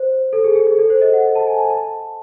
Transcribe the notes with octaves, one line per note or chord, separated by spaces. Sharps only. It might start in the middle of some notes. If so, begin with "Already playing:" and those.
Already playing: C5
A4
G#4
G#4
G#4
A4
C5
D#5
F#5
A5
G#5
A5
A5